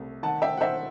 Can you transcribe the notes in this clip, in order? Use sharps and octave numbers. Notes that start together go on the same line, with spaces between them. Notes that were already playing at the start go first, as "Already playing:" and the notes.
Already playing: C2 A3
D#3 F#5 A5
E5 G5
F#5
D#3 C5 E5